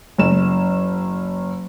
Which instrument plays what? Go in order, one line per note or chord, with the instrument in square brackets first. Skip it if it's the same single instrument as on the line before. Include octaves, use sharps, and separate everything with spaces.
[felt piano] F#1 E7